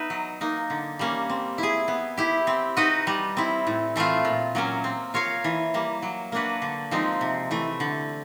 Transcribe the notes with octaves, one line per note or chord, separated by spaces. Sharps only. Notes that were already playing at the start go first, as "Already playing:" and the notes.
Already playing: B3 D#4 B4 E5
F#3
A#3 D#4
D3
G3 A#3 C#4
C4
E4 G#4
B3
E4 G4
C4
D#4 F#4 B4 D#5
G3
C4 E4
A2
E3 A3 C4 F4
A#2
F#3 A#3 C#4
C4
F4 A#4 C#5 F5
E3
G3 A#3
F#3
A#3 D4 F#4 B4
D3
F3 G#3 C4 D#4
C3
E3 A3
D3